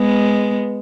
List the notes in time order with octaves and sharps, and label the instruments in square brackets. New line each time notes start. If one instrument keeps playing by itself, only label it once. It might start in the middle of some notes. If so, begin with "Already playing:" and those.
Already playing: [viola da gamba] G#3 B3